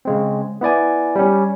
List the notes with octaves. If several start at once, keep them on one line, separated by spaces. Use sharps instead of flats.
C#3 G#3 C4
B3 E4 D5 G#5
G3 C#4